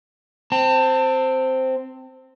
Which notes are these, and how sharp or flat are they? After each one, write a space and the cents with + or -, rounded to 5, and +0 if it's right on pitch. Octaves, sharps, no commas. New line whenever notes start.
C4 +0 A5 +25